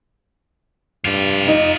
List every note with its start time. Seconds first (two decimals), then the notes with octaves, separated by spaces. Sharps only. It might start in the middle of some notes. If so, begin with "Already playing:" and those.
1.05 G2 F4 G4
1.47 D#4 D#5